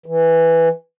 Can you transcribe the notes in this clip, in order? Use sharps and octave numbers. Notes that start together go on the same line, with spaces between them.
E3